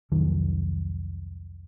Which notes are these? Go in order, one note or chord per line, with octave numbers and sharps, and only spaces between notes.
C2 F2 D#3 F#3